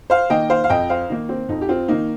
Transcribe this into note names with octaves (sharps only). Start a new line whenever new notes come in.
C5 F5
D#3 A#3 D#5 G5
C5 F5
F5
F2 D#5 G5
C5 F5
D#3 A#3 D#4
C4
F2 D#4
G4
C4 F4
D#3 A#3 D#4